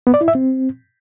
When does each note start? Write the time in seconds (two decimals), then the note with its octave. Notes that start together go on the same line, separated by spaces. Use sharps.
0.07 B3
0.14 D5
0.21 E4
0.28 E5
0.35 C4